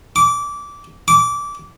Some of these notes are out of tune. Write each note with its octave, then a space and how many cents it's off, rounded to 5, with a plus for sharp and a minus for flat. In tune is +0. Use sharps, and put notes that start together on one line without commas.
D6 -20
D6 -20